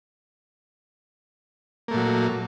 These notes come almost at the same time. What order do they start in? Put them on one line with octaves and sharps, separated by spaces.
A#3 A3 A#2 F#3